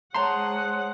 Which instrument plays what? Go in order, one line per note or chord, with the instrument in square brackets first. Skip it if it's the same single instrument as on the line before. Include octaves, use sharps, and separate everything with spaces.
[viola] G#3 F#5 [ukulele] C5 A5 A#5 [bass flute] C#5 [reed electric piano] C6